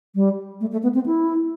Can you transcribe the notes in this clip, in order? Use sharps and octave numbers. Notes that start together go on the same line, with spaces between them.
G3
A3
A3
B3
C4
E4